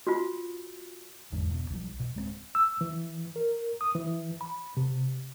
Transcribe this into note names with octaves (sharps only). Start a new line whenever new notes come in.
F4 F#4
G#1 E2 G#2 D3
E1 B2
B1 F3 G3
B2
D1 G#3 A#3 C4
E6
E3
A#4
D#6
E3
B5
C3